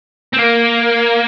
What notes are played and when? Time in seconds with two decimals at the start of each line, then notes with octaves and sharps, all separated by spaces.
0.33 C4
0.38 A#3